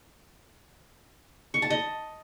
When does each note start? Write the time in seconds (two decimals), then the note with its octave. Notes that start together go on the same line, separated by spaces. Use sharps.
1.54 C#6
1.62 A5
1.70 D#5